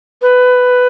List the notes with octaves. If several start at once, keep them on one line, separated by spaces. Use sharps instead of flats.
B4